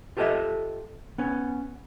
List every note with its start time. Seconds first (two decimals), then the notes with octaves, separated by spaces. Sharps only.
0.17 F4 G4 A4 C#5 D#5 E5
1.18 B3 C#4